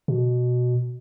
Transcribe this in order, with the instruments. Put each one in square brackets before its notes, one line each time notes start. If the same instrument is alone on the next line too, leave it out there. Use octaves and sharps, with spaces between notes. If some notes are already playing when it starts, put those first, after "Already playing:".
[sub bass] B2